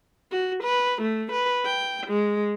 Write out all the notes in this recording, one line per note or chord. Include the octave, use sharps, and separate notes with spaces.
F#4
B4
A3
B4
G5
G#3